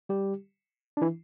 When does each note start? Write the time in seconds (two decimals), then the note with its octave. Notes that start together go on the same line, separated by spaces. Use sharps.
0.09 G3 G4
0.97 D4
1.02 E3 E4